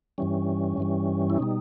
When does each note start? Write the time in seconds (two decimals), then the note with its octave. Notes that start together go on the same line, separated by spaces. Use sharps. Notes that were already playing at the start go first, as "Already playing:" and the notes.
0.18 G2 E3 G3 C#4
0.77 G2 E3 G3
1.30 E4
1.38 B2 G3 D#4